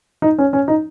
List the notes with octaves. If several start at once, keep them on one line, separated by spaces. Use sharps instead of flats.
D#4
C#4
C#4
D#4